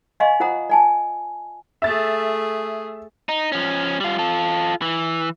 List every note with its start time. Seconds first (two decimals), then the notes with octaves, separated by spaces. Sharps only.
0.20 D5 D#5 F5 G#5 C6 C#6
0.40 F4 C5 F#5 A#5 D#6
0.70 D5 G#5 A5
1.82 A3 G#4 E5 A6
3.29 D#4
3.52 F3 C#4
4.00 G3 F4
4.19 F4 A4
4.82 E3